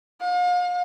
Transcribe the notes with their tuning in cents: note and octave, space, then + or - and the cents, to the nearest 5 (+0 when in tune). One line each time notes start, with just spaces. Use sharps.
F5 +40